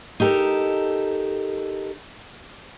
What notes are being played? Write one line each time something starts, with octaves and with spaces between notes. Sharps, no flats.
D#4 G4 A4 A#4